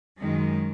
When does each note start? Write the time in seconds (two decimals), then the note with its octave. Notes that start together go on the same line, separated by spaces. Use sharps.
0.20 F#2 D#3 G#3